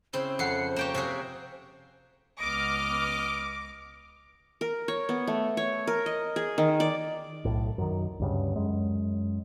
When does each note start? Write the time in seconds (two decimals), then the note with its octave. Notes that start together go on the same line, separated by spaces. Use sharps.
0.13 C#3 C4 E4 C5
0.39 F2 F#5 C7 C#7
0.76 A#3 G4 C#5 G5 E7
0.94 C3 F#4 G#4
2.40 C#2 B3 D#5 D6 F6
4.61 A#4
4.88 C#5
5.09 B3
5.27 A3
5.57 C#5
5.87 A#4
6.06 D#5
6.36 G#4
6.58 D#3
6.80 D5
7.45 B1 A2
7.78 F#2 D#3
8.20 D2 G2 C#3
8.56 F#2 G#3